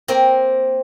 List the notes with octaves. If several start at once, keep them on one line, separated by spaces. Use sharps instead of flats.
A#3 C4